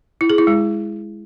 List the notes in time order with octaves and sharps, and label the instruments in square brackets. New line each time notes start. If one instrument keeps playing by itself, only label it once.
[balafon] E4
G#4
E4
G#3